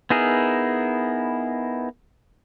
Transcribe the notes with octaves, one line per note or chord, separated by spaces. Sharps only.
B3 D#4 E4 G#4 A#4